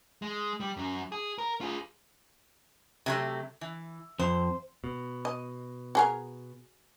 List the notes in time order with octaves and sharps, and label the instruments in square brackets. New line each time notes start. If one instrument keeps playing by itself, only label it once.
[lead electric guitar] G#3
G3
F#2 F#3
G#4
A#4
F4 G#4
[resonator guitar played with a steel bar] C3 F#3 A3
E3
[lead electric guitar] F2 [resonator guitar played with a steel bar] C5
[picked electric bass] B2
[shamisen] D#5
F#4 G#4 A#4